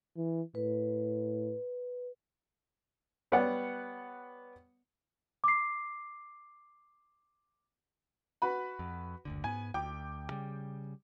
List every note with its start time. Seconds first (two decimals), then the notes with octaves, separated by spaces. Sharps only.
0.17 E3
0.55 A2 B4
3.32 G3 B3 C#5 D5 F#5
5.44 D6 C7
8.42 F#4 B4 B5
8.79 F2
9.25 F#1 D2 D3
9.44 G#2 B3 G#5
9.74 D2 G5 D6
10.30 C#3 G3